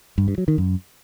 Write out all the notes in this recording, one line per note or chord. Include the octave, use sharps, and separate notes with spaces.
G2
G2
F#3
D#3
F#2